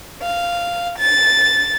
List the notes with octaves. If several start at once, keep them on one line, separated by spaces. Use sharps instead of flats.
F5
A6